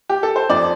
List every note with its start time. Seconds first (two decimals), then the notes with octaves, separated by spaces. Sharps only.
0.09 G4
0.23 A4
0.36 C5
0.49 F2 D5